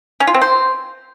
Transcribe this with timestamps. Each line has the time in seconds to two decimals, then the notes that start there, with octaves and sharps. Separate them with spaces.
0.20 C#4
0.27 F4
0.34 C4
0.41 C5